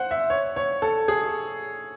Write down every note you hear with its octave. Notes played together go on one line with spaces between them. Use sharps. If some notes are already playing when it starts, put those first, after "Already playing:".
Already playing: C5 F#5
E5
C#5
C#5
A4
G#4